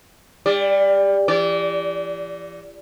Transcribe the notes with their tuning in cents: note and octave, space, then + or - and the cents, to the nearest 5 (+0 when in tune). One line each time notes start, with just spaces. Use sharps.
G3 +30 D5 +0
E3 +45 D5 -25